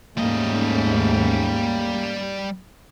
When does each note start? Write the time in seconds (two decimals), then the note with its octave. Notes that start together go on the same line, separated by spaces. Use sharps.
0.17 D#2 G#2 G3 A3 A#3 C#4 D#5